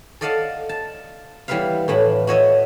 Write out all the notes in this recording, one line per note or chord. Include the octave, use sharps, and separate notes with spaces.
A4 D5 D#5 F5 F#5 A5
A5
E3 G3 B3 B4 E5 F5
A2 E3 E4 B5
F#4 C#5 D#5 E5